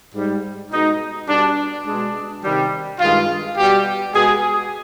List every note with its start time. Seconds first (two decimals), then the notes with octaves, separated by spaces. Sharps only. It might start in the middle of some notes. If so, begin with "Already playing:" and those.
0.13 G#2 G3
0.71 B2 G#3 D#4
1.28 B2 G3 D4
1.85 B2 G#3 D4
2.43 C3 D#3 G3
3.00 G2 D#3 G#3 F4
3.57 B2 G3 G4
4.14 B2 G#3 G#4